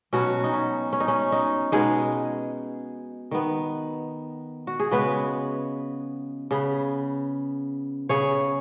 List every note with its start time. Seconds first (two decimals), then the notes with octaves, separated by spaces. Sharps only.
0.13 B2 F#3 B3 C#4 F#4
0.44 D#4
0.53 C#4
0.93 C#4
1.00 D#4
1.08 C#4
1.32 D#4
1.72 B2 G#3 B3 D#4 G#4
3.31 D#3 B3
4.67 F#4
4.80 G#4
4.91 C#3 G#3 B3 F#4 B4
6.51 C#3 B3
8.09 C#3 B3 G#4 C#5